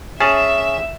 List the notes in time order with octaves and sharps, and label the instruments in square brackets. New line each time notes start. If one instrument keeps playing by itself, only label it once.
[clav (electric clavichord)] C#4 G#4 A5 [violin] E5